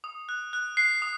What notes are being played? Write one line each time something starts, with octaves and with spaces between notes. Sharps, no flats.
D#6
F#6
F#6
F#6 C7
D#6